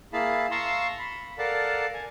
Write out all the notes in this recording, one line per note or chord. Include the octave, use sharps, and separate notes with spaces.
A#3 E4 G#4 F5 A5 B5
F5 A5 A#5 C6 C#6 E6
B5
A4 A#4 D5 F5 F#5 A5
G#5